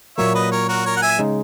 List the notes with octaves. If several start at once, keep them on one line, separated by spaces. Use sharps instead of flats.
A#2 F#3 A#3 C#5 E5
B4 D#5
A#4 C#5
F#4 A#4
A#4 C#5
F#5
E5 G#5
C#3 G#3 D#4